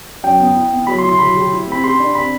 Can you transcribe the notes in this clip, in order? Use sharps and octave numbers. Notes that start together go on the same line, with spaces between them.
F#2 G5
B3
E4
B3
F#3 B5
C6
E4
C6
F#3 B5
G4
E4
C4 B5
G4 C6
D4
C4 B5